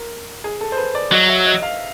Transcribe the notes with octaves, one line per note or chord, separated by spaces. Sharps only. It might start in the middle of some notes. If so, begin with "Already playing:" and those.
Already playing: A#4
G#4
A4
C5
B4
D5
F#3 D#5
E5
D#5
F5